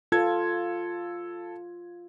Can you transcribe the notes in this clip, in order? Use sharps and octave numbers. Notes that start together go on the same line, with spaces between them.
F4 A4 G#6